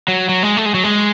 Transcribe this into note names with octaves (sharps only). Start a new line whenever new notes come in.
F#3
F#3
G#3
A3
G#3
F#3
G#3